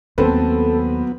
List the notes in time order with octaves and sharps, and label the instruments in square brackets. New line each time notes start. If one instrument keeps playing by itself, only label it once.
[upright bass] D#2 [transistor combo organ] F#3 B3 [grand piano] C4 B4 [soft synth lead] A4